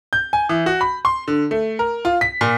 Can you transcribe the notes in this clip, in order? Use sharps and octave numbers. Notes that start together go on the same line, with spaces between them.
G6
G#5
E3
F#4
B5
C6
D3
A3
A#4
F4
B6
A#2